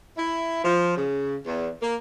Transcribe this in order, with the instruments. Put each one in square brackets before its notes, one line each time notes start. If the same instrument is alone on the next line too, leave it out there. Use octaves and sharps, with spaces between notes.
[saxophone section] E4
F3
C#3
E2
A#3